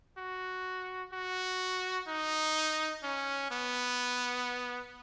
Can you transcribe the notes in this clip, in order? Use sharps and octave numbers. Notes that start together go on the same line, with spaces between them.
F#4
F#4
D#4
C#4
B3